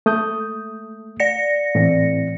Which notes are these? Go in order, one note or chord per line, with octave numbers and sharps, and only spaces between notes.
A3 D#6 G6
D5 A#6 C#7
A2 E3 C4